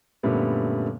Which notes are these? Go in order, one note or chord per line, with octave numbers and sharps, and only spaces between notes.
F#2 A#2 D3 G3 A3 B3